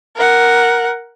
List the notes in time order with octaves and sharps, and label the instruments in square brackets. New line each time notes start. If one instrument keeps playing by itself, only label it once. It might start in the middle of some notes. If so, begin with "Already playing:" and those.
[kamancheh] A#4 F#5